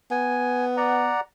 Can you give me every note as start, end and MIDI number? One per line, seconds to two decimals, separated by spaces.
0.11 1.13 59
0.11 0.65 80
0.77 1.20 74
0.77 1.20 78
0.77 1.20 82